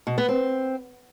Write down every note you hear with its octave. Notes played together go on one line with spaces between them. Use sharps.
B2
B3
C4